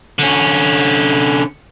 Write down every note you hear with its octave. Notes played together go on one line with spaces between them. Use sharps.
D3 C#4